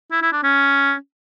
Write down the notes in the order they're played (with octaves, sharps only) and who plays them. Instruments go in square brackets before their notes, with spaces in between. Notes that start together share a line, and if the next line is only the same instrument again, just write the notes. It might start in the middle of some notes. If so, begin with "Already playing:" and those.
[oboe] E4
E4
D4
C#4